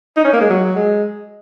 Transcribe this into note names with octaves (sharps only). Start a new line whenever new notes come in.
D#4
C#4
A#3
G#3
F#3
G#3